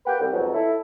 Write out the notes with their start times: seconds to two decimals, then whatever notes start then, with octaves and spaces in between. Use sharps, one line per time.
0.05 A#3 B4 F#5 G5
0.19 C2
0.32 F2 G#2 B2 F#3
0.53 E4 A4